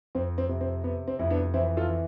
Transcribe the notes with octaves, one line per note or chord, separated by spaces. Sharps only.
F2 C4
C4
C3
C4
C3 B3
C4
F2 E4
B3 D4
E3 C4 E4
F4 A4
E3